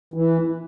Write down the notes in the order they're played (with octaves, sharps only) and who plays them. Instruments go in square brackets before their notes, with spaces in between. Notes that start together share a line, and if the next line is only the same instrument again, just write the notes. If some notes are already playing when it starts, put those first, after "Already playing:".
[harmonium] E3